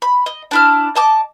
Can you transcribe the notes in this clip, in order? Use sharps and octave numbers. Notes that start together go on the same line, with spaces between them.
B5
D#5
D4 E4 F6
D#5 A5 D6